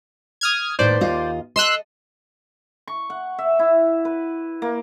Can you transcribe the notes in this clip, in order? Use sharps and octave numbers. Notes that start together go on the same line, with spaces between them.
D#6 F6 G#6
D#2 A2 B4 C5 D5
D#2 F4 D#5
A4 D#5 C6 E6 F#6
C#6
F#5
E5
E4
B4
A#3